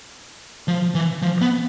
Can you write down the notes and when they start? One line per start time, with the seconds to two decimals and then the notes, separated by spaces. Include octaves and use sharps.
0.68 F3
0.95 E3
1.22 F3
1.41 B3